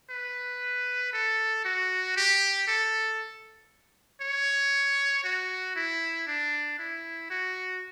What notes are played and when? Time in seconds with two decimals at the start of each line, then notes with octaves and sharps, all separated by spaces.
0.10 B4
1.13 A4
1.65 F#4
2.16 G4
2.67 A4
4.21 C#5
5.24 F#4
5.76 E4
6.27 D4
6.79 E4
7.30 F#4